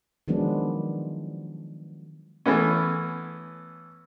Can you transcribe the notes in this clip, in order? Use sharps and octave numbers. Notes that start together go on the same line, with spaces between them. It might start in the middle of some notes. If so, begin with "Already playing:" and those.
D#3 F3 F#3 G#3 B3 D4
E3 A3 B3 C#4